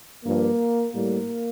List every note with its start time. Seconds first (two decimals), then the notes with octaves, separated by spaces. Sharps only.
0.25 G2 F3 A#3
0.93 A2 G3 A#3